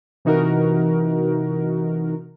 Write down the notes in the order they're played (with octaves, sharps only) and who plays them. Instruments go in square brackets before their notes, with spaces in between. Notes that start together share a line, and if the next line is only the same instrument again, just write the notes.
[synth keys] C3 E3 D#4 F#4 A#4